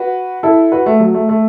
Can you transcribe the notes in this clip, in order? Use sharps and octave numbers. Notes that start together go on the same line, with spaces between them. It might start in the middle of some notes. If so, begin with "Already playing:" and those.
Already playing: F#4 B4
E4 A4
F#4 B4
A3
F#3
A3
A3